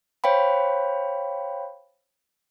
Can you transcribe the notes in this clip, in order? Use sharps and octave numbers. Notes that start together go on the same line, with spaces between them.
C5 C#5 F5 G5 B5